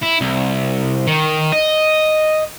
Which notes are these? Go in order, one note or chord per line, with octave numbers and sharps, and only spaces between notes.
E4
C2
D#3
D#5